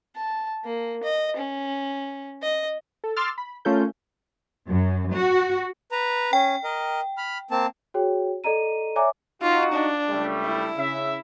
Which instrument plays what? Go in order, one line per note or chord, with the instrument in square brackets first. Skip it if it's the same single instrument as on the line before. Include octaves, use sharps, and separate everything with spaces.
[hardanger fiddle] A5
A#3
D#5
C#4
D#5
[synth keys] A4
C6 D6 E6 F6 A6
B5
A3 C#4 F4 A4 A#4 G6
[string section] F#2
F#4
[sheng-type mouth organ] B4 A#5
[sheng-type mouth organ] C#4 [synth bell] G5
[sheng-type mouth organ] A#4 D#5
B5 F6
A#3 C4 A5
[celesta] F#4 G#4 C#5 G5
A4 D5 D#5 A#5 D#7
C#5 D5 E5 G#5 A#5 D6
[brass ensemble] D#4 F#4 [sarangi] F4
[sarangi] D4
[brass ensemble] C#2 G3 A3
[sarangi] E4
[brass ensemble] C#3 E5